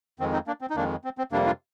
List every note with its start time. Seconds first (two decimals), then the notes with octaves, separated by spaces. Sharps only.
0.20 F2 D#3 G#3 C4
0.33 C4 D#4
0.47 A#3 D4
0.61 C4
0.70 D#4
0.76 F2 D#3 G#3 A#3 D4
1.04 C4
1.18 C4
1.32 F2 C3 G3 A#3 D4
1.46 D4 F4